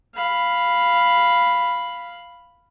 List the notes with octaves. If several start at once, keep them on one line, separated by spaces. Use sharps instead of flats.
F5 B5